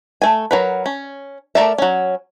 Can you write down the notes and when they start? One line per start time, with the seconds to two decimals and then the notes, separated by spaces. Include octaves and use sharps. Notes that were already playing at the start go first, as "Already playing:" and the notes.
0.22 A3 G#5
0.51 F#3 A#4 B4
0.86 C#4
1.55 A3 A#4 D5 E5
1.78 F#3 C#4